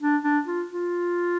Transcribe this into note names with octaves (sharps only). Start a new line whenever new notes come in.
D4
D4
F4
F4